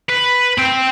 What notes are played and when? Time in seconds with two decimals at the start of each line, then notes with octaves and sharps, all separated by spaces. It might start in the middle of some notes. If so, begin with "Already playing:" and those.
0.10 B4
0.58 C4 G5